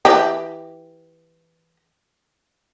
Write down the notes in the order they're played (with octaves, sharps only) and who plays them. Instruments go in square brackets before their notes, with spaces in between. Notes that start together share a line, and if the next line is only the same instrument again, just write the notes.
[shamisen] E3 G4